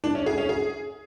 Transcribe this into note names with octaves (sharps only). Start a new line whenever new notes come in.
D4
C#4
G#4
C#4
G#4